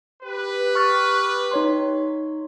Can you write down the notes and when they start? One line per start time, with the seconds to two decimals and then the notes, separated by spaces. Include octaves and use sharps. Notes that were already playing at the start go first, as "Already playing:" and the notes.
0.23 G4 B4
0.75 C#6 F6 A6
1.51 D#4 C#5 C6